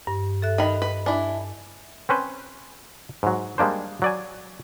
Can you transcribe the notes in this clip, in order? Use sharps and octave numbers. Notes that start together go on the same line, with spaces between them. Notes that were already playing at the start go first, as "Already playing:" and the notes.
G2
A4 E5 F#6
D#3 D#5 B5
B4
D4 E4 G#5
C4 C#4 B4 C5
G#2 F#3
G3 G#3 A#3 D4 C5
F#3 D5 G#5